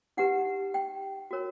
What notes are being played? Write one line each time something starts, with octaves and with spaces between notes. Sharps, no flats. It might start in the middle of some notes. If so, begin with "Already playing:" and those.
D#4 G4 B4 F#5
G5
F#4 A#4 C#5